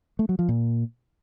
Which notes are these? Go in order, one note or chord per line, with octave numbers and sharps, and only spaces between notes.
A3
F#3
F3
A#2